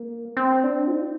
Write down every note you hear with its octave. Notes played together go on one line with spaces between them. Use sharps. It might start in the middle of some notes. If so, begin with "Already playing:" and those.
Already playing: A#3
C4
D4
F4
D#4